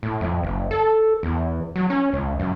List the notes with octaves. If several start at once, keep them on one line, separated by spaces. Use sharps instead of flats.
A2
F2
F#1
A4
E2
F#3
C#4
C#2
F#2